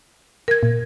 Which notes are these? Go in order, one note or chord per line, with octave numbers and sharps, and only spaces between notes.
A#4 G#6
A#2